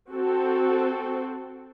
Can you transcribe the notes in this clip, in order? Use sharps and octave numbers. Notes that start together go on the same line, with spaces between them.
C4 F#4 A4